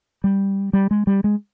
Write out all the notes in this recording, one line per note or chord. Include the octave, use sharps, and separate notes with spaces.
G3
G3
G#3
G3
G#3